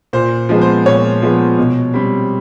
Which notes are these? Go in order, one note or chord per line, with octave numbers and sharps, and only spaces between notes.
A#2 C5
F3 G#3 B3
C5
A#2 C#5
F3 G#3 B3
B2
G3 C4